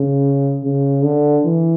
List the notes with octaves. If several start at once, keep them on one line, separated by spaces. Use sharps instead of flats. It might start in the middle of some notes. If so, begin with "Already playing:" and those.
Already playing: C#3
C#3
D3
E3